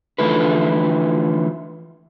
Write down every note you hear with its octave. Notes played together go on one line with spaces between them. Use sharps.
D3 E3 F3 A3 E4 B4